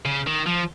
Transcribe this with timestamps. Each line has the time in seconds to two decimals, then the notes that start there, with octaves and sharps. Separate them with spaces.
0.06 C#3
0.27 D#3
0.47 F3